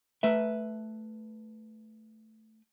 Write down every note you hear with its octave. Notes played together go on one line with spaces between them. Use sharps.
A3 B4 E5